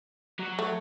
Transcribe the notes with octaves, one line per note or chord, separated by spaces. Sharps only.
F#3
A3